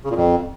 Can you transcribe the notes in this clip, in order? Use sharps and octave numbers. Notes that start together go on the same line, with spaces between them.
C#3
A#2
F2